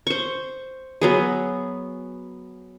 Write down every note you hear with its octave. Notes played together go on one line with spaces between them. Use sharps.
C5 C#6
F#3 B3 G#4